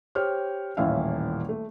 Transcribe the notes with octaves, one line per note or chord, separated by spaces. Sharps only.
G4 C5 C#5 F6
D#1 A1 C#4 E4 E5 F5
A3